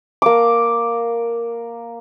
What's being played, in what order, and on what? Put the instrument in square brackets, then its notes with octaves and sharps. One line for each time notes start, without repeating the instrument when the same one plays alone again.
[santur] A#3 D6